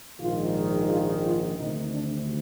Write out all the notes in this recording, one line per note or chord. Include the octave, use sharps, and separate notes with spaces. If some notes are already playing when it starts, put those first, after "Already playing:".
A#1 G#2 D#3 F4
F4
F4
D2 C3 D#3 D#4
D4